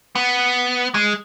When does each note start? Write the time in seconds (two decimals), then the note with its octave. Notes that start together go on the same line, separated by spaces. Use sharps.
0.15 B3
0.94 G#3